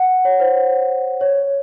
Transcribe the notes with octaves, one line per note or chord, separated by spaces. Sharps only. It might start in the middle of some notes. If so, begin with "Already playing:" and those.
Already playing: F#5
C#5
C5
C#5